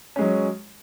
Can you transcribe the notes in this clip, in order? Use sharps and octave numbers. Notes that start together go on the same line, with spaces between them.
F#3 G#3 C#4